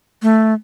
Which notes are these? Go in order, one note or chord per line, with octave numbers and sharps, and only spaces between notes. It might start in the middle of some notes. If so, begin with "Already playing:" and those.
A3